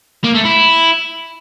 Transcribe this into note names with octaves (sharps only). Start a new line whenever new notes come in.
A#3
A3
E4